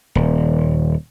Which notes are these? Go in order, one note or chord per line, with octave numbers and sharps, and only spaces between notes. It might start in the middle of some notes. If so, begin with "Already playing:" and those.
D#1